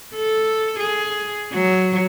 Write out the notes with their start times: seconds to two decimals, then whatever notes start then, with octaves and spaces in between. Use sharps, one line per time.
0.15 A4
0.79 G#4
1.53 F#3